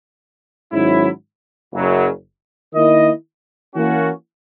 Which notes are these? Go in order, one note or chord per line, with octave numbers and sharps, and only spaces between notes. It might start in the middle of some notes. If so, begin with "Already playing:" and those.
G#2 D#3 F#3 C#4 E4
F#1 F#2 C#3 F#3
D#3 A#3 E4 A#4 D#5
E3 A#3 C#4 F#4